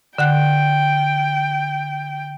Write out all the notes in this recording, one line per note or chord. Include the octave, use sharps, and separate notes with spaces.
D3 F#5 G5 F#6